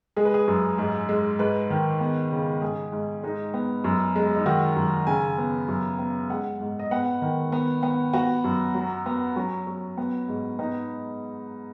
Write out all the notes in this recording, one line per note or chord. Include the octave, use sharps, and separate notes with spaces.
G#3 G#4
B4
G#4
F#2
G#2
G#3
G#2 B4
D#3
B3
C#3
G#2 G#4
G#2
G#3 D#4
B3
F#2
G#3
D#4
D#3 F#4
F#2
C#3 G#5
B3
F#2
B3
G#3 F#5
G#2
D#5
B3 F#5
D#3
B3
B3
B3 F#4
F#2
F#3
B3
F#3 C#4
F#3
B3
G#2
B3 D#4